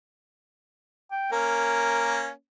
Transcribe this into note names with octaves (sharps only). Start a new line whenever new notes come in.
G5
A#3 C#4 A#4